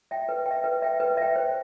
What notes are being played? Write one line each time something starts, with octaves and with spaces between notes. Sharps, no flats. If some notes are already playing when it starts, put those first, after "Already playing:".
E5 G5
B4
E5 G5
B4
E5 G5
B4
E5 G5
C5